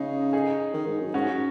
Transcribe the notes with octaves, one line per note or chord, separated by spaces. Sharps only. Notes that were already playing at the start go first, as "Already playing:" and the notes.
Already playing: C#3 D#4 G#4
D#4 G#4
D#3
G#2
F#2
G#2 C#4 F#4